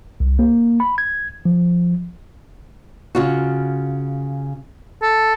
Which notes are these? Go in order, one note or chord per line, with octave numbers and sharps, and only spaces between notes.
C2
A#3
B5
G#6
F3
C#3 F4 F#4
A4